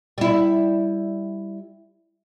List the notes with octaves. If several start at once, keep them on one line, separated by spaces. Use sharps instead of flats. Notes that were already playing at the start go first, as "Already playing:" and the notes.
G3 E4